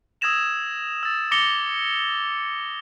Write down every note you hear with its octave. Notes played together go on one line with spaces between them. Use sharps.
D#6 E6 G#6 A#6 E7 F7
E6 A6
D6 A6 A#6 C#7 F7 G7